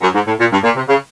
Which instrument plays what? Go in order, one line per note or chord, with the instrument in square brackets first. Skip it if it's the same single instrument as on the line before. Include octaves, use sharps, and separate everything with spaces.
[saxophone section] F#2
G#2
A2
A#2
G2
A#2
C3
C#3